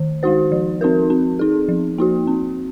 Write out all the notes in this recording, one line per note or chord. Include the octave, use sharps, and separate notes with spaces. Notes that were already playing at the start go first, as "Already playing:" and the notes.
Already playing: D#3
G#3 D#4 F#4 C5
F3
C4 D#4 F#4 A#4
C4
D#4 G#4
F3
A#3 D#4 F#4
C4